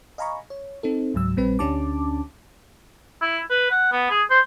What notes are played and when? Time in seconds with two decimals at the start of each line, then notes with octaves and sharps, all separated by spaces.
0.18 D#5 F5 G#5 A#5 B5 C#6
0.50 C#5
0.83 C4 D#4 A4
1.14 C#2 G#2 F#3 E6
1.37 A#1 G3 C4 B4
1.59 D2 C#4 D4 G4 A5 D6
3.22 E4
3.50 B4
3.71 F#5
3.92 B3
4.10 G#4
4.30 C5